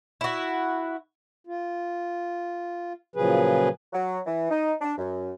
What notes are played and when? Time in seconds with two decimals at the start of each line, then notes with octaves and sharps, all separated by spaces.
0.21 E4 F#4
1.47 F4
3.16 A#2 C#3 F3 F#3 G#4 B4
3.93 F#3
4.26 E3
4.50 D#4
4.81 D4
4.97 F#2